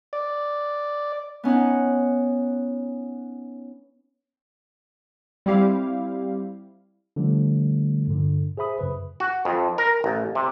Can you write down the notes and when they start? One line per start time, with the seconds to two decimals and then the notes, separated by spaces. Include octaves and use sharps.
0.13 D5
1.44 B3 C#4 D#4 F#5
5.46 G3 C4 E4 G4 F5
7.16 D3 F3 G3 A3
8.08 G2 A#2 D3
8.57 G#4 C5 E5 B5 D#6
8.79 F#2 C#3 B4
9.20 F#4
9.45 F2
9.78 A#4
10.04 A1
10.35 C3